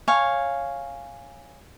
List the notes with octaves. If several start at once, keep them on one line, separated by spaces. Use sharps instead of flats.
C#5 F5 G#5